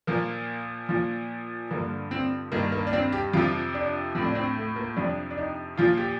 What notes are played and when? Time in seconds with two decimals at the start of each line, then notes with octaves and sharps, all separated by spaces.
0.07 A#2 F3 A#3
0.89 A#2 F3
1.71 G2 D3 F3 A#3
2.11 C4
2.52 G2 D#3 A#3
2.72 A#3
2.87 D4
2.93 C4
3.12 G4
3.33 F2 C3 F3 F4
3.74 D4
4.15 F3 C4
4.18 A2
4.25 D4
4.35 C4
4.56 A3
4.76 A#3
4.96 F2 C3 F3 D4
5.31 D4
5.37 D#4
5.77 A#2 F3 F4
5.97 G4